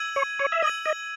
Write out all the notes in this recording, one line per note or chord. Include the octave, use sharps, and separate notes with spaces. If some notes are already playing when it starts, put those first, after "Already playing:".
Already playing: E6 G#6 D#7 F#7
C#5
C#5
E5
D#5 E6 G#6 D#7 F#7
D#5